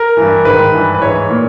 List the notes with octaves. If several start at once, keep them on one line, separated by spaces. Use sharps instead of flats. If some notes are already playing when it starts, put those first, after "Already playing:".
Already playing: A#4
G2 E3
G#2 D#3 B4
G2 E3
B4
G#2 E3 C#5
A#2